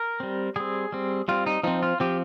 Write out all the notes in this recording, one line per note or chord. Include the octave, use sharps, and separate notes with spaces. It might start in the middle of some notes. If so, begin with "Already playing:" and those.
Already playing: A#4
G3 C4
G3 C4 G#4
G3 C4
G3 C4 F4
D#4
F3 C4 D#4
F4
F3 C4 G4